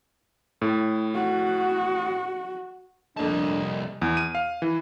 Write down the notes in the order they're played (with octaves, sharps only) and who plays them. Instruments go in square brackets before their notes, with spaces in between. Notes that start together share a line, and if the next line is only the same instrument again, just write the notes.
[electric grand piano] A2
[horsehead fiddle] F#4
[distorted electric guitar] C2 A5 [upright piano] F2 A#2 A3 [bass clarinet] D4 [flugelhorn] D#5
[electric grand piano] E2
D#7
F5
E3